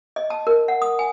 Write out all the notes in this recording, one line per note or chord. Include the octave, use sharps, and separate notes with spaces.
D#5
A5
A#4
F#5
D#6
G#5